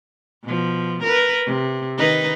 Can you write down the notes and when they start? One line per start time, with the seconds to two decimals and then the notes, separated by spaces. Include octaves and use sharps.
0.44 B2 F3
1.03 A#4 B4
1.46 C3
1.97 D#3 D#4 B4